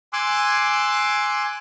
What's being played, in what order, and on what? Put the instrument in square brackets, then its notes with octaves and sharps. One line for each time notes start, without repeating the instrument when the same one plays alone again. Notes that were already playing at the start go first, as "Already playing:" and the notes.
[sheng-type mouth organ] G#5 C6 D6 E6 F#6